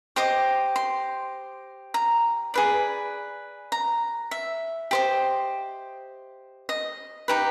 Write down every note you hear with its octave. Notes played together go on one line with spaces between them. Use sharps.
G4 C5 D#5 D6
C6
A#5
G#4 B4 D5
A#5
E5
G4 C5 D#5
D#5
D#4 G4 B4